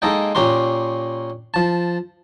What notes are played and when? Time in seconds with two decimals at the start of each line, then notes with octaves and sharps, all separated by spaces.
0.02 G#3 A#3 D#4 A4 D#5 G5
0.35 A#2 C#4 G4 A#4 C6
1.54 F3 A5